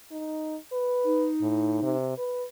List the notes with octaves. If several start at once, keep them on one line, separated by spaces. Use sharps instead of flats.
D#4
B4
D#4
A2
C3
B4